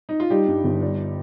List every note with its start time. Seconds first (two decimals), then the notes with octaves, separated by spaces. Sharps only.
0.09 D#4
0.20 F4
0.30 G3 D#4 G4
0.47 G2
0.64 G1
0.82 G3